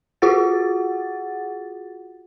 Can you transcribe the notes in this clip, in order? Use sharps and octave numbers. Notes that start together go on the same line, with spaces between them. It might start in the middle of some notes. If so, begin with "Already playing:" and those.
F4 F#4 G#4 F#5 A6